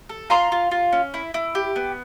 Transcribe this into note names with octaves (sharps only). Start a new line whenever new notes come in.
A4
F4 A#5 C6
F4
F4
C#4
E4
E4
G4
B3